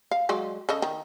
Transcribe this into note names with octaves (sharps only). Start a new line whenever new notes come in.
F5
F#3 G#3 D5
C#3 A4 D#5
D#3